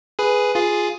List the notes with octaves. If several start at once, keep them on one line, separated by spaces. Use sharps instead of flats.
G#4 B4
F4 G#4